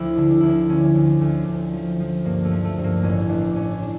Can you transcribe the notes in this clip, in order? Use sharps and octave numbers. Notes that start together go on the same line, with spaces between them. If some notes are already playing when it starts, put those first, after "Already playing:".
Already playing: D2 F3 E4
D3
D4
D2 E4
D4
F3 C#4
D2
D2
D2
F3
F3
G2 A#3
A3
F3
A3
G2
A#3
A1 C#4
A1 D4
A1 C#4
D4